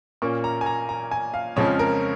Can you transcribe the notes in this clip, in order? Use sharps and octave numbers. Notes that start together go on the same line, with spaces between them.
A#2 A#3 C#4 C#6
A#5
G#5
A#5
A#5
G#5
F5
F2 C#3 F3 G#3 C#4 C#5
A#4